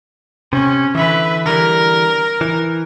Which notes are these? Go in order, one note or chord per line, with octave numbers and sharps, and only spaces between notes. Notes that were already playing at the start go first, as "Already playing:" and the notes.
C3 C#4
D3 E3 B4 E5
D3 E3 G3 A#4
E3